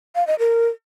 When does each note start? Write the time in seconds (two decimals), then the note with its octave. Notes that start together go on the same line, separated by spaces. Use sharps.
0.15 F5
0.27 D#5
0.39 A#4